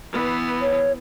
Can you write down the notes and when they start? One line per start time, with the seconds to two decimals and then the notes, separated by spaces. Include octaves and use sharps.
0.11 E3 B3
0.62 C#5